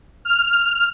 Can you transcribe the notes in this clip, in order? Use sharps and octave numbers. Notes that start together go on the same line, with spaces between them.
F6